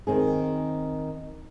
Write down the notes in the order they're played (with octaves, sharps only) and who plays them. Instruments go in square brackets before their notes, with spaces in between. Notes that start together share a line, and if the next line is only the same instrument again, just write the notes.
[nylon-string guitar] D#3 C4 G#4